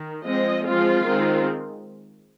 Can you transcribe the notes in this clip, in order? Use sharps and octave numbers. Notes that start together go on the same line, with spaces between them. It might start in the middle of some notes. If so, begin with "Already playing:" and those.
Already playing: D#3
F3 G#3 C4 D#5
F3 G#3 C4 F4
D#3 G#3 C4